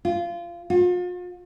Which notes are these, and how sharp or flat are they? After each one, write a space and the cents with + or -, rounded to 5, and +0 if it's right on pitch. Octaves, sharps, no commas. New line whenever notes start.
F4 -20
F4 +40